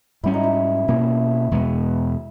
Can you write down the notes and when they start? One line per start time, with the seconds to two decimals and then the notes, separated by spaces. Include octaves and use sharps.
0.23 G#2 G3 C#4 E4
0.34 D#4
0.43 E4
0.88 B2 A#3 C#4 E4
1.51 E2 B2 G#3 B3